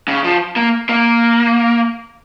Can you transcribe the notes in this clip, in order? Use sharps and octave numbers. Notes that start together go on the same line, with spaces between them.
C#3
F3
A#3
A#3